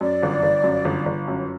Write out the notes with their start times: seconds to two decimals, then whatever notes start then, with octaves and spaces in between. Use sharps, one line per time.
0.01 F#2 D5
0.23 G1
0.43 G1
0.64 F#2
0.85 G1
1.06 G1
1.28 F#2